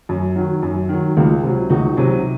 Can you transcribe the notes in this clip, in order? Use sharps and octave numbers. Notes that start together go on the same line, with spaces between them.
F#2
D#3 F#3
F#2
D#3 F#3
C#2 F4
C3 F#3
C#2 D#4 F#4
C3 F#3